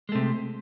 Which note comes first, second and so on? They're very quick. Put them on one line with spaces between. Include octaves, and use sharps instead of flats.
G#3 A3 C3